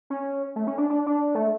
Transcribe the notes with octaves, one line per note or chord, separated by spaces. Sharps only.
C#4
A3
C#4
D4
D4
D4
A3